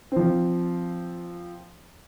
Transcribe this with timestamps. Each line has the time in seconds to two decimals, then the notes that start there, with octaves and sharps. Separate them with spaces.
0.12 F3 C4